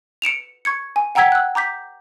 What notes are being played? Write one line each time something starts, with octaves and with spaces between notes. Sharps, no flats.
C#7 D7 E7 F7
C#6 G#6 C#7
G#5
F#5 G5 A#5 E6 G#6 B6
E6 F#6
A#5 D6 G6 B6